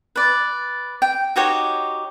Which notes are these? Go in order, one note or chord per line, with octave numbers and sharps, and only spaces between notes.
B4 D5
G5
D#4 F#4 G4 C#5